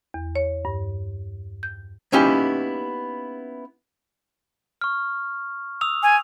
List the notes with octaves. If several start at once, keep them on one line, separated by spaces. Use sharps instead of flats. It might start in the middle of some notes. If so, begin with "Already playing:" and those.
E2
C#5
G2
G6
A#3 B3 C#4 D#4 E4 G4
C#6 F6
D#6 E6 F7
G#5